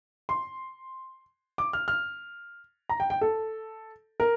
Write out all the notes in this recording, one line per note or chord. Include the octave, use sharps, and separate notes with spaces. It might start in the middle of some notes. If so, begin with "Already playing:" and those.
C6
D6
F6
F6
A#5
G5
G5
A4
A#4